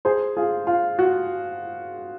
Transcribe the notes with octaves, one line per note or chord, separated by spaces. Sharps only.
G#4 C5
F4 G#4
F4
F#4